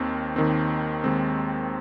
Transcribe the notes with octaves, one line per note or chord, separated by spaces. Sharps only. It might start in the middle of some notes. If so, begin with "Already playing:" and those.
Already playing: D#2 D#3 C4
D#2 D#3 C4
D#2 D#3 G#3 C4